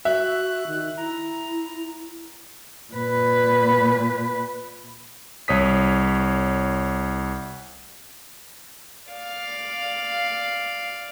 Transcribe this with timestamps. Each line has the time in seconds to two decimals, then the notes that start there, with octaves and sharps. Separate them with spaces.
0.05 F#4 E5 F#6
0.67 D#3
0.97 E4 A#5
2.93 A#2 B4
5.48 C2 C#5 D#6 B6
9.10 D5 F5